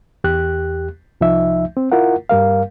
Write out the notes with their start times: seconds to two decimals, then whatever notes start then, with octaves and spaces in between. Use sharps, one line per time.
0.24 E2 G4 F#6
1.21 C2 F3 D#4 E5
1.77 C4
1.92 E4 F4 A#4 F#5
2.29 G2 G3 A#4 F5